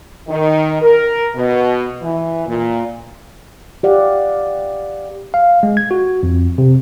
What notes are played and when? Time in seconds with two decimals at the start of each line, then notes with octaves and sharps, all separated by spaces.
0.28 D#3
0.81 A#4
1.35 B2
2.02 E3
2.47 A#2
3.83 G4 D5 F5 F#5
5.34 F5
5.63 G#3
5.77 G#6
5.91 F#4
6.23 F2
6.58 C3